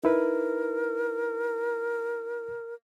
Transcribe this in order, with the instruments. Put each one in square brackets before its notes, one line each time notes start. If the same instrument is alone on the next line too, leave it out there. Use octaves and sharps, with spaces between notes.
[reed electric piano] D#4 E4 B4 [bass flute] A#4